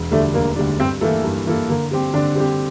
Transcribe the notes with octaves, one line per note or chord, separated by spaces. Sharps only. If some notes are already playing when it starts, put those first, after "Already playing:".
Already playing: E1
D2 D3 G3 A3 D4
E1 A#3
D2 D3 G3 D4
G2 C4
E3 A3 A#3 E4 A4
G2
E3 A#3 E4 A4
D3 A#3
G3 C4 G4
D3 D4
G3 C4 G4